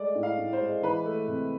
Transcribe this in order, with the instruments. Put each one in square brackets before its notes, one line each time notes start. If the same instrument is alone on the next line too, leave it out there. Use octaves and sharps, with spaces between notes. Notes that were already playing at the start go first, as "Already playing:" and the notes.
Already playing: [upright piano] G#3 A3 D5
A2
F5
A2
C5
G#3
E3 B4
A3
C3